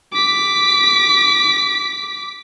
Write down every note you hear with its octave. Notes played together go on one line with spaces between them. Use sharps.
D6 B6